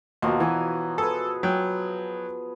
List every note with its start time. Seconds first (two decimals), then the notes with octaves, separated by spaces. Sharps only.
0.22 D#2 B2 F3 F#3
0.40 E3 G#5
0.98 G#4 A4 B4
1.43 F#3 G5